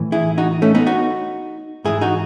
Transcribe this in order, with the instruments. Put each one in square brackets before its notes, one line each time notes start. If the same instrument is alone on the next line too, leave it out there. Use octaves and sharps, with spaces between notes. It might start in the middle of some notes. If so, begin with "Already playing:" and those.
Already playing: [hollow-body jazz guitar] A2 E3
E4 G#4
D#4 F#4
A3 C#4
B3 D#4
D#4 F#4
G#2 E3 E4 G#4
D#4 F#4